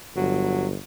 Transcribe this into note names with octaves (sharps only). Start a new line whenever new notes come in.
G1 F#3